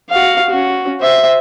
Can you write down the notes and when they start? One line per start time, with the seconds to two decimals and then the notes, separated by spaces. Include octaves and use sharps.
0.10 F#4 F5
0.50 C#4 F#4
1.00 C5 E5